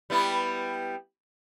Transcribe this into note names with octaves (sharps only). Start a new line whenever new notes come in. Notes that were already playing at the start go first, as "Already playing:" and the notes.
G3 B3 E4